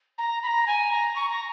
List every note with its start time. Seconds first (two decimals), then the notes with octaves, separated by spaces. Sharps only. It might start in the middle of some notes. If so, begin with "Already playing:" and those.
0.17 A#5
0.42 B5
0.46 A#5
0.66 G#5
0.91 A#5
1.15 C#6
1.28 A#5